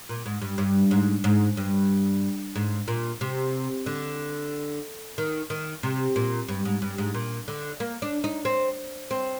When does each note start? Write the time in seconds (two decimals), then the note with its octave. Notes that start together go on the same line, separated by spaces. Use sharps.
0.09 A#2
0.26 G#2
0.41 G2
0.58 G2
0.91 G#2
1.24 G#2
1.57 G2
2.56 G#2
2.88 A#2
3.21 C3
3.86 D3
5.18 D#3
5.50 D#3
5.83 C3
6.16 A#2
6.49 G2
6.65 G#2
6.82 G2
6.98 G#2
7.14 A#2
7.48 D3
7.80 A#3
8.02 D4
8.24 D#4
8.45 C4
9.11 C4